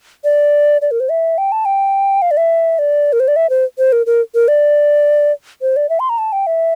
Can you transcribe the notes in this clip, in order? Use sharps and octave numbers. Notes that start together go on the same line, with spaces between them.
D5
D5
A#4
C5
E5
G5
A5
G5
F5
D5
E5
D5
A#4
C5
D5
E5
C5
C5
A#4
A#4
A#4
D5
C5
D5
E5
C6
A#5
A5
G5
E5